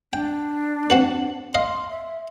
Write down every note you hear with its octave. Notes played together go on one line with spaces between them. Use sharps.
D4 G5
C4 F#4 B4
D#5 F5 C6
E5